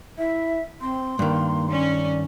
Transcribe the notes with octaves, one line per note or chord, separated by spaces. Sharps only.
E4 E5
C4 C6
G2 D#3 A#3
C#4 D5